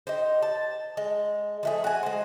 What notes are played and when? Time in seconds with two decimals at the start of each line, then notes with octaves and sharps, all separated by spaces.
0.07 D#4 G4 C5
0.42 A5
0.97 G#3
1.63 F3 A3 G#4
1.84 F#4 G#5
2.03 G#3 C5